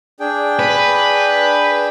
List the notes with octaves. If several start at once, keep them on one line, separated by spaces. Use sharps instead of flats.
D4 G#4 G5
B4